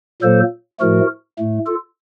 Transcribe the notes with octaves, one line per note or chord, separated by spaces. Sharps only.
A#2 F#3 A#3 A4 C5
A2 F3 A3 F#4 A#4
A2 A3
F4 A4